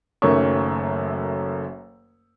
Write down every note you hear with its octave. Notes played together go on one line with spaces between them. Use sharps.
F#1 F#2 D#3 A3 C#4 C#6